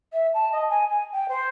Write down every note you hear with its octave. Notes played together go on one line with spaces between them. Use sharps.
E5
A5
D#5
G#5
G#5
G5
C5